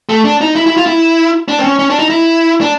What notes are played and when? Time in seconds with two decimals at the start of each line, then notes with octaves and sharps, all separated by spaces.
0.09 A3
0.25 D4
0.41 D#4
0.56 E4
0.66 E4
0.77 F4
0.86 E4
1.48 D4
1.59 C4
1.64 C#4
1.79 C#4
1.90 D4
1.99 D#4
2.10 E4
2.61 D4